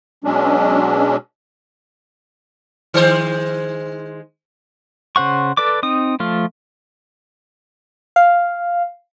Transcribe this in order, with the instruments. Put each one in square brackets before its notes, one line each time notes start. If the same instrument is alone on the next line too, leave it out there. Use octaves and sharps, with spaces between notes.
[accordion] B2 F#3 G#3 C#4 D4
[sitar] D#3 G#3 C5
[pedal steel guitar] C#3 C5 F#5 C#6
A4 B4 D5 D6
C4 D#4 D#6
F3 A3 F4
[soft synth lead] F5